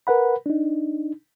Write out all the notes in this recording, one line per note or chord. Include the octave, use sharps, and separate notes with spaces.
A#4 B4 F#5 B5
D4 D#4